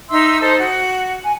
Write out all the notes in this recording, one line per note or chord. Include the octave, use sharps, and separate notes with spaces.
D#4 E5 C6 E6
D#4 A4 C5 D#5
F#4
G#5